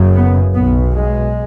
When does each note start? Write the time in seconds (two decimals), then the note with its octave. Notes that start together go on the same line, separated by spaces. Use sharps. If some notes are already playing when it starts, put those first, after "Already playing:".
Already playing: F#1 F#2 C#3
0.14 B3
0.54 B1 B2 B3
0.94 G#3